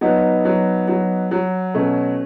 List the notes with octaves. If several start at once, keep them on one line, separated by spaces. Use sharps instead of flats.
F#3 B3 D#4
F#3
F#3
F#3
B2 A3 C#4